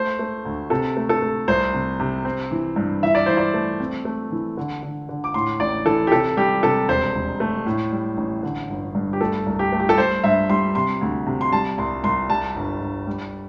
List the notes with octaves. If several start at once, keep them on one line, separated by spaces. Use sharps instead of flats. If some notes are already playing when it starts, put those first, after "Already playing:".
Already playing: A3 C5
A3
D2
C3 A4
A3
A4
A3
C2 C5
C3
C3
C4
E3
G2
E3 E5
D5
E3 C5
D5
A3
C4
A3
E3
D3
D3
D3
D6
A2 C6
A1 D5
E3 A4
G4
C3 A4
G3 G4
C3 A4
E1 C5
E1
A3
A2
G3
A1
D3
G1
G2
G4
A3 A4
C2
G4
A3
G4
A4
G3 C5
G2 E5
G3 C6
C3 C6
D2
C3
C6
G3 A5
C2 C6
C2 C6
G3 A5
G1
G1
G3